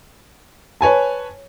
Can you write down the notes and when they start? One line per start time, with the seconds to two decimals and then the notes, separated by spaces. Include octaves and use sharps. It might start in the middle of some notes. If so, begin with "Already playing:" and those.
0.81 B4 C#5 G#5 A5